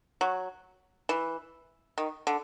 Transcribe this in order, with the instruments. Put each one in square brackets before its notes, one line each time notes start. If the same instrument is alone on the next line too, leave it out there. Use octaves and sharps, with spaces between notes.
[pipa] F#3
E3
D#3
D3